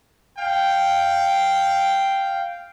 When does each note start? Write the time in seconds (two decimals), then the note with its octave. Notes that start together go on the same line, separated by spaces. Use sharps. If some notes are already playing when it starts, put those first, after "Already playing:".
0.38 F5 G5